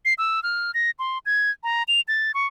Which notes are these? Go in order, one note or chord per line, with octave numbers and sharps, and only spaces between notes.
C7
E6
F6
A#6
C6
G#6
A#5
F7
A6
C#6